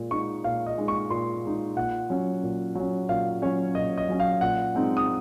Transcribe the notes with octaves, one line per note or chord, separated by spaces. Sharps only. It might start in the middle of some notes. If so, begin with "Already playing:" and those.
Already playing: A#2 G#3
G#3 D#4 C#6
A#2 F5
D#5
G#3 D#4
C#6
A#2 C6
G#3 D#4
A#2 F#5
F#3 C#4
A#2
F#3 C#4
A#2 F5
F#3 C#4 C#5
A#2 D#5
D#5
F#3 C#4
F5
A#2 F#5
G#3 C4 D#4
D#6